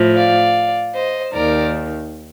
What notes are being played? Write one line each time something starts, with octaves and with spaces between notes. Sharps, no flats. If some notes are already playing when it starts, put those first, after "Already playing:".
Already playing: A2 F3
D5 F5
C5 D#5
D#2 D#3 A#4 D5